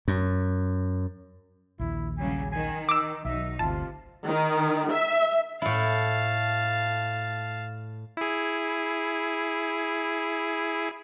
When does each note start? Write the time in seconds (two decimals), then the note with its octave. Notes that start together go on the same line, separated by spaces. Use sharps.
0.08 F#2
1.79 A#1 D#2 E4
2.18 C#3 F#3 G3 G#5
2.51 D#3 G#5
2.89 D#4 D6 E6
3.25 B1 F#3 D#4 E5
3.59 G1 D2 C3 F4 A5
4.26 D#3
4.92 E5
5.62 A2 E4 F5 A5
8.17 E4 G#4